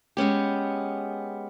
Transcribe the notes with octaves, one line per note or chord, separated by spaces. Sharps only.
G#3 B3 C#4 G4